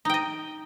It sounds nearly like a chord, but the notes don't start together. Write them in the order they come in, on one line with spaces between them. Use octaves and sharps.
D#4 G5 D#5